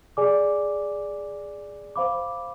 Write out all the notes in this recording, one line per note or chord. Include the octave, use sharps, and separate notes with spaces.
G#4 D5 G#5 D6
C5 F5 B5 D6